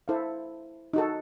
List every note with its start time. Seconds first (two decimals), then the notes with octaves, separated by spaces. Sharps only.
0.08 E4 A4 C5 F5
0.93 D#4 F#4 A4